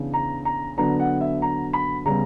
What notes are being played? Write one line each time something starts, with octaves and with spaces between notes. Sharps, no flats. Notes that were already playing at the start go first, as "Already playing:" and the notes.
Already playing: C#3 E3 B3 D4
A#5
A#5
D3 F#3 B3 D4 A#5
F#5
E5
A#5
B5
C#3 G3 B3 A#5